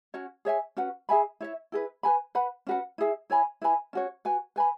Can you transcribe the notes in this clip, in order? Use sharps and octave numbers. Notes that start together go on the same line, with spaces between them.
C#4 F#4 C#5
G#4 C#5 E5 G#5
C#4 F#4 B4 F#5
G#4 E5 G#5 B5
E4 C#5 E5
E4 G#4 B4
B4 G#5 B5
B4 F#5 B5
C#4 F#4 B4 F#5
E4 G#4 E5
E4 C#5 G#5 B5
E4 B4 G#5 B5
C#4 F#4 C#5
F#4 B4 G#5
B4 G#5 B5